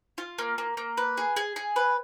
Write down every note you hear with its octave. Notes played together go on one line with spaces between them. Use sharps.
F4
A#3
A#3
A#3
B4
G#4
G#4
G#4
B4